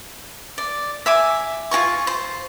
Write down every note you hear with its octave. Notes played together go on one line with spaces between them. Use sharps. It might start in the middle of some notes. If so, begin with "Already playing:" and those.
D5
E5 G#5 D6
F4 F#4 G#5 C#6
C5